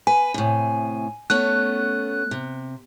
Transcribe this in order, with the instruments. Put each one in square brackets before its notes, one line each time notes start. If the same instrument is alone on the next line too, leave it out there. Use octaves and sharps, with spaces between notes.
[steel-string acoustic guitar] B4 [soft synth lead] G#5
[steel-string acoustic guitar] A2 C3
[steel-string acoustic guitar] A3 B3 C#4 [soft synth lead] F#6
[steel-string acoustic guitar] C3